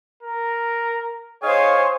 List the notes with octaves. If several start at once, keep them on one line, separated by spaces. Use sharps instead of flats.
A#4
D#4 G#4 C5 C#5 F5 G#5